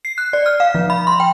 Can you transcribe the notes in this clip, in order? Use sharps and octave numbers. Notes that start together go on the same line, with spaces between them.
C7
F#6
D5
F6
F5
F3
B5
C6
G5